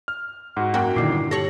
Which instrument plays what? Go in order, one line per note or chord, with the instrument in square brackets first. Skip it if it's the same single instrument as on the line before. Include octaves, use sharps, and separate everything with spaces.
[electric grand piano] F6
[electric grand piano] G#2 F#4 [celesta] F#5
[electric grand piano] F#2 A#3 G5 [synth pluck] F#4
[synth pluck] A#2 D3 D#3 [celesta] E4 D6 C7
[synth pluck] G2
[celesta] G4 F#7 [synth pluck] A4 C#5 C#6 [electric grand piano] A#6